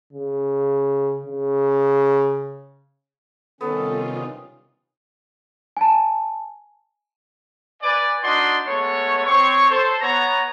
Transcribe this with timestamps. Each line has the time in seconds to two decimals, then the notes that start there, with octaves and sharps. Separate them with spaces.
0.13 C#3
1.26 C#3
3.61 C3 D#3 G3 B3 C#4 F4 A4
5.77 G#5 A5
7.82 B4 D5 G#5
8.22 D4 D#4 F#4 D5 D#5 C6
8.67 G#3 A3 B3 C#5
9.26 C4 C#5 C#6
9.69 A4 C5
10.01 B3 C#5 A#5